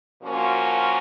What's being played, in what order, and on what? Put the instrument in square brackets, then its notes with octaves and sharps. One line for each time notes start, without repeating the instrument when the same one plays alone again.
[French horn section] A#2 F3 A#3 C#4 F#4